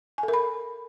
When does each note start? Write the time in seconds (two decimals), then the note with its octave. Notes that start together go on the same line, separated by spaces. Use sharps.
0.18 G#5
0.23 A4
0.28 A#4
0.33 B5